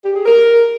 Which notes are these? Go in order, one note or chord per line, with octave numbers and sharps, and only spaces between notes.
G4
G#4
A#4